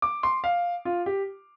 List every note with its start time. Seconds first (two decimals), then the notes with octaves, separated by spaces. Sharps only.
0.02 D6
0.23 C6
0.44 F5
0.85 F4
1.06 G4